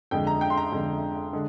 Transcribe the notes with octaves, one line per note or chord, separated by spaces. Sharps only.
F2 D3 G#3 G5
A#5
G5
C6
A#5
F2 D3 G#3
D3 G#3